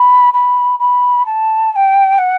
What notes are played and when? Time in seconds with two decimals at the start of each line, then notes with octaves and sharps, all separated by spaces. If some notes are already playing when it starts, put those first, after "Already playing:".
Already playing: B5
0.33 B5
0.79 B5
1.26 A5
1.72 A5
1.76 G5
2.18 F#5